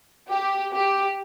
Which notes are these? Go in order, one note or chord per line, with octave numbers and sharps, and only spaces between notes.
G4
G4